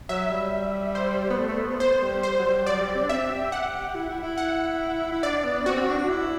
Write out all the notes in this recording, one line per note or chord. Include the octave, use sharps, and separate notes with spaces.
F#3 E5
G3
C5
B3
A3
A3
B3
B3
B3 C5
G3
C5
F#3
G3
F#3 D5
G3
C4
D4
C4 E5
G4
F#5
E4
E4
E4
F#5
E4
D4 D5
B3
D4
C4 F#4
C4
D4
D4
E4